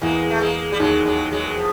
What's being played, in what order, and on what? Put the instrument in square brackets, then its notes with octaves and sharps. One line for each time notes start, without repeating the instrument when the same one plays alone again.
[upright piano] E2 E3 [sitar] G#3 A#3
[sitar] A3
G#3 A#3
G3
[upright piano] D#2 D#3 [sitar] F#3 G#3
[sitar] F#3 G#3
F#3 G#3
F3